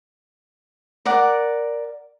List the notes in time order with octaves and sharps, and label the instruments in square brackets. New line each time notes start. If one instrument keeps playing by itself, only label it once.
[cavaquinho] A#4 D5 F#5